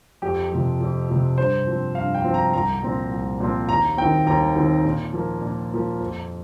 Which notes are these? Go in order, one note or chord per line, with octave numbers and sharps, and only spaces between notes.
F2 G4
C3 F3
F2
C3 F3
G2 C5
F3 C4
G2 F5
G5
F3 C4
A#5
C2 A#5
A#2 F3 C4
C2
A#2 F3 C4
D#2 A#5
D#3 C4 G5
D#2 A#5
D#3 C4
A#2
F3 A#3
A#2
F3 A#3
F2